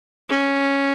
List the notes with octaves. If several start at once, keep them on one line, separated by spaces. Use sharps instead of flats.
C#4